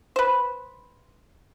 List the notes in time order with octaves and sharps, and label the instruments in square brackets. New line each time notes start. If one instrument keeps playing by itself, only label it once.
[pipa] B4 C5